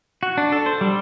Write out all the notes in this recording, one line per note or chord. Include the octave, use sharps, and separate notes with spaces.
F#4
D4
A4
C5
G3